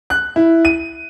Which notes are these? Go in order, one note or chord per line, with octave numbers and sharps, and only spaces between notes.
F#6
E4
D#7